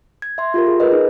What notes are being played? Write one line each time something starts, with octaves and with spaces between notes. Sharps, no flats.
G#6
E5 C6
F4 G4 A#4
G#4
A#4 B4 D#5
D#4 G#4